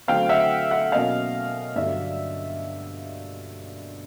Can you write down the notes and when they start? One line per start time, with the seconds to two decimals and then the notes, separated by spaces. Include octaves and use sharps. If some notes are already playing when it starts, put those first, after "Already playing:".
0.08 D3 F#3 A3 C4 F5 G5
0.29 E5 F#5
0.71 E5 F#5
0.92 B2 F#3 A#3 C#4 D#5 F5
1.76 G2 D3 F#3 D5 E5